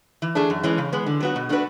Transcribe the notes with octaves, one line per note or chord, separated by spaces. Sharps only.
E3
A3 D4 G#4
F#2
E3 G#3 C#4
C#3
G#3 B3
D3
F#3 B3 F#4
B2
A3 D4 F#4 B4